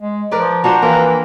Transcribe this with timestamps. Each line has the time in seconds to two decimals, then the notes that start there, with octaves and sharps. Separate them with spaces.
0.01 G#3
0.31 F3 A#4 B4 D5
0.64 F3 D4 F#4 C5 A#5
0.82 E3 A#3 C4